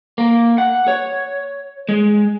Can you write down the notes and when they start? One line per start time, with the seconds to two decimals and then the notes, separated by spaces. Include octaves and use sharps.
0.18 A#3
0.58 F#5
0.88 C#5
1.89 G#3